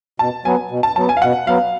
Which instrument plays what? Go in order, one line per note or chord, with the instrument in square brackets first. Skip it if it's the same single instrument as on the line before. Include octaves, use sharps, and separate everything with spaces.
[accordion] B2 [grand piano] A5
[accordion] F#3 B3 [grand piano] G#5
[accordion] B2
[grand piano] A5
[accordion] F#3 B3 [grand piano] A5
[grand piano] G#5
F5
[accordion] B2 [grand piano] F#5
[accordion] F#3 B3 [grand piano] F5